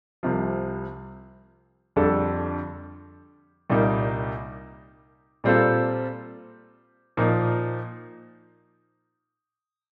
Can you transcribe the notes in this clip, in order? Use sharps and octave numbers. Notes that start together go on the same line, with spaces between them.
C2 C3 F3
F2 D3 G3 D4 A4
C2 A#2 G3 A#3 D#4
A#2 G3 C4 F4 A4
A#2 F3 A#3 D#4